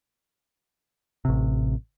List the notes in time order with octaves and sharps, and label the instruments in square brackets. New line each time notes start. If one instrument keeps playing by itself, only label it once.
[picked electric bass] A1 C3